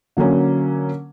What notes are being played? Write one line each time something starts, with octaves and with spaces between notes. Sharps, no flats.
D3 F#3 A#3 C#4